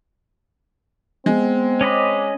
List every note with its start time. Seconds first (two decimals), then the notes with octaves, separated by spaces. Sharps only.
1.26 G#3 B3 C4
1.81 C#4 D#5 B5 D6